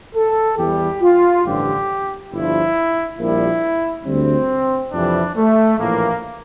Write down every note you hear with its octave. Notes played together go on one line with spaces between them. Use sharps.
A4
E2 E3 G3 G4
F4
A1 G2 D3 F3 G4
G1 G2 F3 E4
A#1 A#2 G3 E4
D2 D3 G3 C4
F2 C3 E3 G3 D4
A3
A#1 A2 E3 A#3